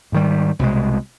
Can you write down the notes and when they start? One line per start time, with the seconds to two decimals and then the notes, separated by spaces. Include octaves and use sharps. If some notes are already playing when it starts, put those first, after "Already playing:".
0.12 G#2 D#3 G3
0.59 C2 B2 G#3